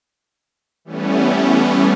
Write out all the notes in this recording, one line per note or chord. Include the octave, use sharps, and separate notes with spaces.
E3 G3 A3 B3 C#4